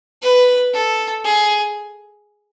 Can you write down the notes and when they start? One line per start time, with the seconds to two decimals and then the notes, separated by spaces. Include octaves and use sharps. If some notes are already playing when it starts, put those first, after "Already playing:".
0.22 B4
0.73 A4
1.25 G#4